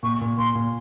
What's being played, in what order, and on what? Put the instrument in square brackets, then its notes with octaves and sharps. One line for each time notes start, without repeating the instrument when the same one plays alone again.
[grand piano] A#2 [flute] C#6
[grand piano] A#2
[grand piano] A#2 [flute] C6
[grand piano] A#2